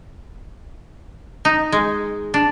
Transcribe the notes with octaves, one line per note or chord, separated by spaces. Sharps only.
D#4
G#3
D4